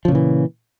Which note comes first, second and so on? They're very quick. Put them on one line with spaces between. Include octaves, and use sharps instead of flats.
F3 C#3 A#2 E3